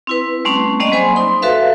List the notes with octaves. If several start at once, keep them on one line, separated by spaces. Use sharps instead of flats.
C4 E4 B4
G3 A3 C4 C#4
G3 A#3 C4 C#4 D5 D#5
F#3 G#4 C5 G#5 B5 C6
D#4 C6
F#4 A4 B4 E5 F5